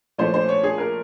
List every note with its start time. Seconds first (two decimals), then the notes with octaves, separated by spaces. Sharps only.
0.18 A#2 F3 A3 C#4 C5
0.34 C5
0.49 C#5
0.63 G#4
0.78 A#4